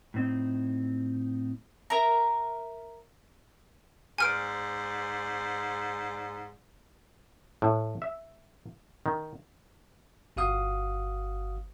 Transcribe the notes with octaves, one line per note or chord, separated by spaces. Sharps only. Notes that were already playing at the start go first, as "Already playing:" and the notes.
A2 C4 D#4
A#4 E5 A#5
G#2 C5 D5 G#5 F6 D7
A2
E5
D#3
G1 F#4 F5 D#6